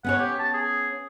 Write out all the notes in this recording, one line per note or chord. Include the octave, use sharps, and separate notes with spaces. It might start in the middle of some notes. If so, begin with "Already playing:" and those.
B3 C#4 C#5 F#5
G4
A5
G#4